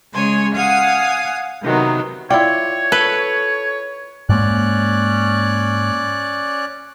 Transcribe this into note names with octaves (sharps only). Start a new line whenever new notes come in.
C#3 G#3 C#5 G#5 C6
F5 F#5 G#5 D#6
C3 D#3 F#3 B3
E4 F4 C#5 D5 G5
A4 B4
G#2 G#3 A#3 C#4 D5 F#6